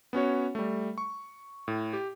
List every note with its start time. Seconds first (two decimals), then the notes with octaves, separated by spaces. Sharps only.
0.13 B3 C#4 F#4 C#5
0.55 G3 A3
0.98 C#6
1.68 A2
1.93 G4